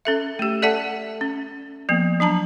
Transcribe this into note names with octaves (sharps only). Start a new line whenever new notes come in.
C#4 A4 E5
A3 G4
A4 D5 E5 F#5 A5
C#4
F3 A#3 B3
F#3 D4 A5 A#5